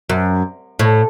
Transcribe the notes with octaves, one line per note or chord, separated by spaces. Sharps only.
F#2
A2